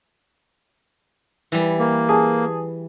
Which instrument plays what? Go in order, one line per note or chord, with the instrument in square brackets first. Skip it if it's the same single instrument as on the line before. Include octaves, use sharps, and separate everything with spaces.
[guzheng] E3 G3
[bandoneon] A#3
[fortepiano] G#4 A5